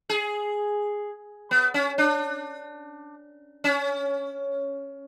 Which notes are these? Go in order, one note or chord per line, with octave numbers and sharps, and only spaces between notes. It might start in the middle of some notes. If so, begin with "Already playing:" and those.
G#4
B3
C#4
D4
C#4